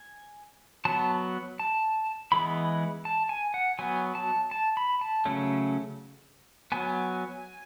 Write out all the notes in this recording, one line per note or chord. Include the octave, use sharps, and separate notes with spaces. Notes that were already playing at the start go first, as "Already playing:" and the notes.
Already playing: G#5
F#3 B3 A5
A5
E3 G#3 B3 B5
A5
G#5
F#5
F#3 B3 G#5
A5
A5
B5
A5
C#3 F#3 A3 C#4
F#3 B3 G#5